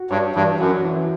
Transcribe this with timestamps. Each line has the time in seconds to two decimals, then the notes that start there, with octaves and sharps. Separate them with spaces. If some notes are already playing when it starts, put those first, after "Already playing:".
Already playing: F#4
0.10 G2 C#5
0.35 G2 E3
0.60 F#2 F#4
0.85 E3